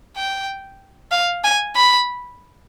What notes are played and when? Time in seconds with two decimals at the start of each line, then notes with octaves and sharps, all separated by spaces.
0.17 G5
1.11 F5
1.44 G#5
1.76 B5